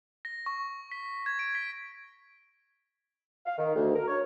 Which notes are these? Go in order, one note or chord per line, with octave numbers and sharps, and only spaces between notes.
A#6
C#6
B6
G#6
D7
B6
F5
D#3
D2
A#4
C#5